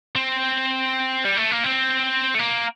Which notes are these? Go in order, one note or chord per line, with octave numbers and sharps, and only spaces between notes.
C4
G3
A3
A#3
C4
A3
A#3